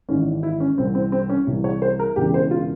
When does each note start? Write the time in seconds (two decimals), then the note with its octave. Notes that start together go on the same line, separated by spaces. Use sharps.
0.09 G#1 G#2 E3 C#4
0.43 E4
0.60 C#4
0.77 C2 C3 E3 C4
0.95 C4
1.12 C4
1.29 C#4
1.47 C2 C3 E3
1.64 C#5
1.82 C5
1.99 A#4
2.16 E1 E2 C#3 E3 G4
2.34 C5
2.51 F4